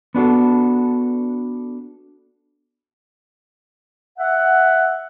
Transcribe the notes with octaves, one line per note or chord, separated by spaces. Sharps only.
B3 D4 F#4 A4
E5 F#5